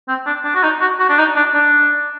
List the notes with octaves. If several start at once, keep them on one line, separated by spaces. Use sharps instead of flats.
C4
D4
D4
F#4
D#4
F#4
F#4
D4
D#4
D4
D4